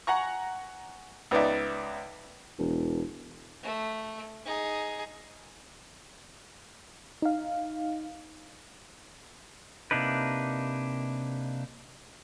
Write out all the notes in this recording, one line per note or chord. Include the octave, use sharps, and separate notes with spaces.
F#5 G#5 A#5 C#6
C#2 B3 D#4 D5 E5
E1
A3
D#4 G#4
D#4 F5
C3 A#3 D4 D#4 B4